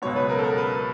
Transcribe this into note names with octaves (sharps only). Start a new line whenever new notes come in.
C#2 B2 F#3 B3 C#5
B4
A#4
A4
A#4
B4